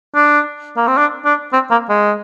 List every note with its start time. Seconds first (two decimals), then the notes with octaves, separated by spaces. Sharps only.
0.15 D4
0.77 A#3
0.88 C4
0.97 D4
1.25 D4
1.53 C4
1.71 A#3
1.89 G#3